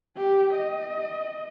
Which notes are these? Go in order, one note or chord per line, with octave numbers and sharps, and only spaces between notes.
G4
D#5